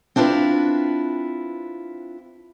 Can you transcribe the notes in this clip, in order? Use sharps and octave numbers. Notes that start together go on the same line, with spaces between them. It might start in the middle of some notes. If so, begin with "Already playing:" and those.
C4 D4 E4 F4 B4